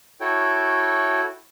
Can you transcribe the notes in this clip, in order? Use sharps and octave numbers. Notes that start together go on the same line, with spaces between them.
E4 F#4 A4 C#5 G5